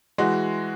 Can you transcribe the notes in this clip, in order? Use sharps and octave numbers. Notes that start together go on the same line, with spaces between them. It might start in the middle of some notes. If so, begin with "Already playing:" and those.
E3 G#3 F#4